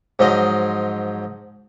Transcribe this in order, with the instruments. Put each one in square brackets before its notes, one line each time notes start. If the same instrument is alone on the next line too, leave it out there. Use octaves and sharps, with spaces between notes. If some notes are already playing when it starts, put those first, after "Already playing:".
[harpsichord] G#2 F3 F#3 D#5 C6